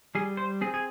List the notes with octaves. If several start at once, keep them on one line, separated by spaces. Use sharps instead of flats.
G3 G#4
C5
C4 G#4
G#4